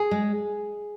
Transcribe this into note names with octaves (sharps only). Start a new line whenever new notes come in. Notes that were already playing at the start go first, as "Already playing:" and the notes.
Already playing: G#4
G#3